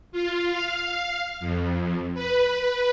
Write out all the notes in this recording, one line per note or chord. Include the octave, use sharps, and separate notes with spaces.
F4
F5
F2
B4